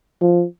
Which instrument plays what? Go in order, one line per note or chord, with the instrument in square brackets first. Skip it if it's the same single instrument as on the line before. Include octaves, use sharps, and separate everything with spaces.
[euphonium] F3